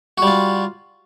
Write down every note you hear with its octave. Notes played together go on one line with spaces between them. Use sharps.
G3 F4 F#4